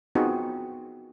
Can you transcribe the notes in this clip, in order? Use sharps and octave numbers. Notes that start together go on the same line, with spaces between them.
B3 C4 D#4 F4 F#4 G#4